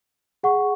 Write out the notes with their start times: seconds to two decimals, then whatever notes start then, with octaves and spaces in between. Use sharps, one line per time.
0.43 G#4 F#5 C#6